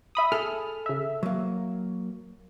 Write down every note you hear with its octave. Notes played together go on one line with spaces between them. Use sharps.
E5 B5 D#6
G#4 A4 F6
C#3 E5
F#3 A#3